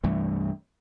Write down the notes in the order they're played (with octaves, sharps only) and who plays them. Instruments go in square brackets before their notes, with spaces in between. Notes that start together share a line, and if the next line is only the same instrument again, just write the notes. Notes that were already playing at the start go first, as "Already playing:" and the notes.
[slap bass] C2 G2 E3 A3